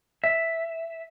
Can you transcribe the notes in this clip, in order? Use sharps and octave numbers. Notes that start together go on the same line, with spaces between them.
E5